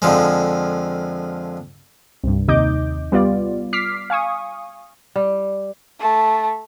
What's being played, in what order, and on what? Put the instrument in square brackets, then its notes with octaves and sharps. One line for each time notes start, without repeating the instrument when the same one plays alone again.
[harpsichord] F2 D3 F3 G#3
[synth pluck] C2 G2
D#2 C3 D#4 D#5 D6 G6
G3 B3 F4 D5
D6 F6 B6 C7
F5 G#5 C#6 D#6
[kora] G3
[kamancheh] A3 A5